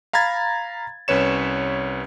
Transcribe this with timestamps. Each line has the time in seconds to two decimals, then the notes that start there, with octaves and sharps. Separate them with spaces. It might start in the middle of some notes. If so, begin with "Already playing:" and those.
0.13 F5 A#5 B5 G#6 A6
1.08 C2 C#4 B4 C#5 E7